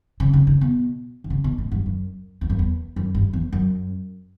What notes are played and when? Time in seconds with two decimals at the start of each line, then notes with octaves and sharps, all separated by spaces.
0.20 C#3
0.33 C#3
0.47 C#3
0.61 B2
1.24 D3
1.30 C#3
1.44 B2
1.58 A2
1.72 G2
1.86 F#2
2.41 E2
2.50 F#2
2.59 E2
2.96 F#2
3.15 G2
3.33 E2
3.53 F#2